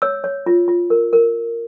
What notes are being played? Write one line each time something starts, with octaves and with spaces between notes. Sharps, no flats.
C#5 E6
C#5
F4
F4
A#4
A#4